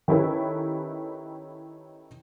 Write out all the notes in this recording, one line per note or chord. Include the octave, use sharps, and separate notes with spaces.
D#3 C#4 E4 G4 A4 B4